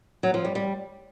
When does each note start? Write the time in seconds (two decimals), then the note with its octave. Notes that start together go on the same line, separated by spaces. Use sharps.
0.23 F#3
0.34 F3
0.45 G3
0.55 G3